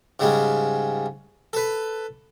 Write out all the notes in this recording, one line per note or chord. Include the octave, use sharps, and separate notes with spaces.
G#2 C#3 G3 G#3
A4 B4